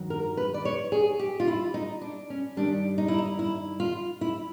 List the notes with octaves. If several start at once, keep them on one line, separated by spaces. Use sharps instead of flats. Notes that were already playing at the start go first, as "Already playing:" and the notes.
Already playing: G2 D#3 F#3
A#4
B4
D5
C#5
G#4
G4
F4
E4
D#4
D4
C#4
G2 D#3 G3 D4
D#4
E4
D#4
E4
F4
E4